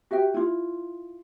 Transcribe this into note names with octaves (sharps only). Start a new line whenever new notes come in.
F#4 G4 E5 G5
E4 F4